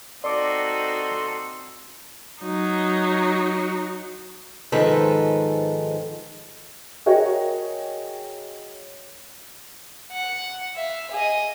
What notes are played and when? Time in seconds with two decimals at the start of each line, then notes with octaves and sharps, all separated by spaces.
0.24 C4 D#4 F#4 A4 D5 C6 D6
2.42 F#3 D#4
4.72 G#2 D#3 F3 G#3 A4 B4
7.06 F#4 G#4 A#4 C#5 D#5 G5
10.12 F#5
10.76 E5 F5
11.11 G#4 D#5